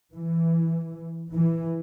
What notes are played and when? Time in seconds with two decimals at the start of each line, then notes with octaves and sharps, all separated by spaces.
0.13 E3
1.32 E3